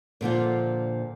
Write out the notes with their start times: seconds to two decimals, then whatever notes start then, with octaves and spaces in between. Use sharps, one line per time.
0.21 A#2 D3 F3 F4